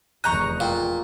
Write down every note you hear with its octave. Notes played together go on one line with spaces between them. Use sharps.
F1 E2 D#5 A#5 C#6 F#6 G6
A#2 F5 G5